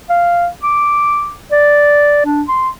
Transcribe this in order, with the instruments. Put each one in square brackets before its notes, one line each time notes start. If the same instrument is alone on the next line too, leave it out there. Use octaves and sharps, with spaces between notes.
[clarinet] F5
D6
D5
D4
C6